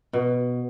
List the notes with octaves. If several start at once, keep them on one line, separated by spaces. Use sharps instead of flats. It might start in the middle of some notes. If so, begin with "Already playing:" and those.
B2